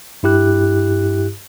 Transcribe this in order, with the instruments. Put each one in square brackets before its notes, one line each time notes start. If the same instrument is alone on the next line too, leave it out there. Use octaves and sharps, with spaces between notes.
[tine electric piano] G2 E4 G4 F#6